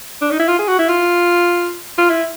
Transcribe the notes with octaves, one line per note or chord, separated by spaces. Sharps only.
D4
D#4
E4
F4
G#4
F#4
E4
F4
F4
E4